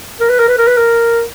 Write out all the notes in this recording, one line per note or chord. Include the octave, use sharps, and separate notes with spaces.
A#4
B4
A#4
B4
A#4
B4
A#4